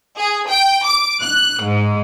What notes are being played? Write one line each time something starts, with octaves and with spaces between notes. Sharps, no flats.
G#4
G5
D6
F#6
G#2